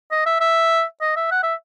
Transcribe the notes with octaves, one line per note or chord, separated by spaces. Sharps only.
D#5
E5
E5
D#5
E5
F#5
E5